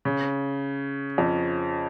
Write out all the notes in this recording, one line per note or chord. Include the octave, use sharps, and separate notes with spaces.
C#3
F2